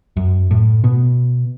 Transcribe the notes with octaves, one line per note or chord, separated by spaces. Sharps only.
F#2
A2
B2